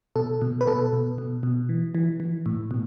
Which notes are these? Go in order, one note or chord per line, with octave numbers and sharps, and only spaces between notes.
B2 A4
B2
B4
B2 A4
B2
B2
B2
E3
E3
E3
A2
B2